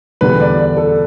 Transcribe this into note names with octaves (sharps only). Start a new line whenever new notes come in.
E2 D3 G3 B4
D5
D5
A4